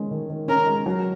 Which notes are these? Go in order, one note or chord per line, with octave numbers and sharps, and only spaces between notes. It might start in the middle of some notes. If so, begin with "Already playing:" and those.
Already playing: D#3 G#3 C#4
D#3
D#3
C#4 A#4
G#3
F#3